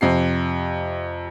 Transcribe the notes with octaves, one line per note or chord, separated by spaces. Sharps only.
F2 C3 C7